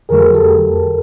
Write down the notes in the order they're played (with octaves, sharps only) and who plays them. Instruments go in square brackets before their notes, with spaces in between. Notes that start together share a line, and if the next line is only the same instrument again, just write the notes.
[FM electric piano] F2 D3 F#3 A3 G#4 A#4
G4 A4